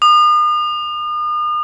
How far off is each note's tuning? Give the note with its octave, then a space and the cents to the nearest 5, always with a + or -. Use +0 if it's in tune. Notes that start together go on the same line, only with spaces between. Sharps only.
D#6 -40